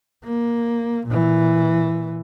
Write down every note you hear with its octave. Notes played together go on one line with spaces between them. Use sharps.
A#3
A#2 E3